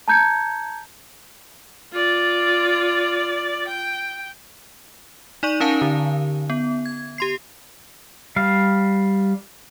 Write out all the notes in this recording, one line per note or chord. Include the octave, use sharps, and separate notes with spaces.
A5 A#5 G6 G#6 C#7
F4 D5
G5
D#4 D5 C#6 D#7
C#4 D#4 A#4 F5 G#5 A5
D3
B3
G#6
G4 C6 C7
G3 F5